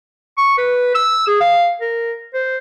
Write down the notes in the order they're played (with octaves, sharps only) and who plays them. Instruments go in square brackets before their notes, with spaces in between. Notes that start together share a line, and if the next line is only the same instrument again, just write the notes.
[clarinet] C#6
B4
E6
G#4
F5
A#4
C5